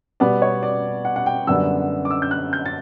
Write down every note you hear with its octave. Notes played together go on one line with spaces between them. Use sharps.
B2 G3 B3 D5
C#5
D5
F#5
F#5
G5
F#2 D3 G3 B3 E6
D6
E6
G6
F#6
G6
A6